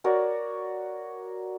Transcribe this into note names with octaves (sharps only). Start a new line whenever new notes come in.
F#4 A#4 C#5 D5